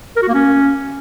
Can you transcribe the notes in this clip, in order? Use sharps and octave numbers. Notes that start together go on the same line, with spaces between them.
A#4
F#4
A#3
C#4